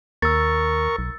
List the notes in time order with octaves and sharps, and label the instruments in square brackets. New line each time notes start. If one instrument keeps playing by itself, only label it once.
[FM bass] D#2 [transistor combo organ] A#4 C#6 [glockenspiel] E6 A6
[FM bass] B1